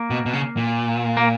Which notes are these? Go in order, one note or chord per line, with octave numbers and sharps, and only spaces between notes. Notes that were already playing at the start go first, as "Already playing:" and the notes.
Already playing: A#3
B2
B2
C#3
A#2
A#3